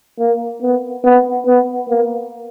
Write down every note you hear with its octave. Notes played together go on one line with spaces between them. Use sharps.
A#3
B3
B3
B3
A#3